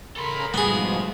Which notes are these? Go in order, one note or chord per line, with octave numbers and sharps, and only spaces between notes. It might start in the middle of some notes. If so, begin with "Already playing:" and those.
C#3 A4 A#4 B5 C6
G#2 B2 F3 G3 A3 B3 F#4 G#4